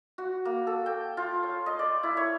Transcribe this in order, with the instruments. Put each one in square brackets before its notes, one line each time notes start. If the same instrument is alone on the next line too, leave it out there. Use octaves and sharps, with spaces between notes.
[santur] F#4
A#3
A4
G5
F4
C#5
D#5
D5
E4
C#5